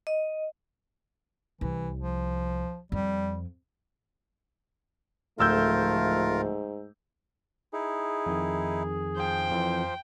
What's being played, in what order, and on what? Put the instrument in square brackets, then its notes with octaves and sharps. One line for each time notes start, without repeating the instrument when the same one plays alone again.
[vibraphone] D#5
[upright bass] C2 [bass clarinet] E3
[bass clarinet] F3
[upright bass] F2 [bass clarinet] G3
[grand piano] D1 E6 G6 [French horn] G#2 [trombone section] F3 A3 [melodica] F4 A#4
[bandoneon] D#4 E4 [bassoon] G#4
[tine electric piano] F2 D#3
[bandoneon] F3 C5 [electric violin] G5
[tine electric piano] F2 E3